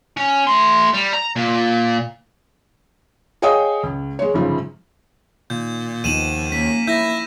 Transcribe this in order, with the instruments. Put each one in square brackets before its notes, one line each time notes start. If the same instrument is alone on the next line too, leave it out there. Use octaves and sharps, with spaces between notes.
[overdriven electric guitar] C#4
A3 C6
G3
A#5
A#2
[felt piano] G#4 C#5 D#5 F5 G5 D#6
C#2
G#3 C#5
G1 G#2 C#3 F3
[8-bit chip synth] A#2 [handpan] D#3 [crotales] G6
[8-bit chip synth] D#2 [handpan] F3 B3 D#4 [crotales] D#7 E7 F#7
[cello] A#3 [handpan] C#4 [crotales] B6
[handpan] E4 [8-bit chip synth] E5 [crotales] G6 A#6